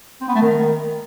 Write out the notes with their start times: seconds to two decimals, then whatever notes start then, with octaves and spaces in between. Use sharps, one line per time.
0.21 C4
0.28 B3
0.35 A3
0.42 D#3